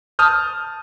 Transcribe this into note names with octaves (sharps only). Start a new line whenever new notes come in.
A5 D#6 F6 G6